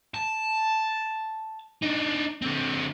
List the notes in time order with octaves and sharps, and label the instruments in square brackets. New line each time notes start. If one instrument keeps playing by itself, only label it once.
[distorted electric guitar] A5
D4 D#4
D3 C4